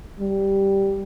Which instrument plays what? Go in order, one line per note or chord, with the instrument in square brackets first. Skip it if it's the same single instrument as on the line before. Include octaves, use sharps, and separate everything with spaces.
[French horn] G3